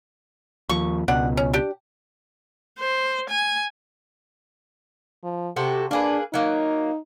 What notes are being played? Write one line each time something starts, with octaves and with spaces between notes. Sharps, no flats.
D#2 F3 C#6
C#2 B2 D4 F#5
C#4
D4 G4
C5
G#5
F3
C3 F#4 G4 A4
A#3 D4 G#4 B4
F#3 A#3 D#4